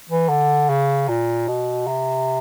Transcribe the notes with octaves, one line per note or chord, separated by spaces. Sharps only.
E3
D3
C#3
A#2
B2
C3